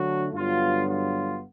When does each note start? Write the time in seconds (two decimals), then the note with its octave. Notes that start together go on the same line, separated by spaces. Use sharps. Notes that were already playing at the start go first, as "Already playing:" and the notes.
Already playing: D3 F#3 A3 D4 F#4
0.33 G2 D3 F#3 B3 F4
0.88 F4